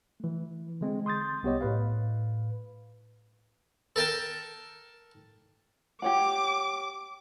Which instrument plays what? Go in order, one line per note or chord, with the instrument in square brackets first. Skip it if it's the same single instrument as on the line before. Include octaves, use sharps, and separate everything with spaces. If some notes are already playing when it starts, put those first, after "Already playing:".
[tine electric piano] E3 A3
D3 G#3 C4
C6 D#6 G6 A6
C2 B3 G4 C#5 D#5
A2 B4 F5
[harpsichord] A4 A#4 G5 A5
[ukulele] G4 C#5 F#5 [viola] D6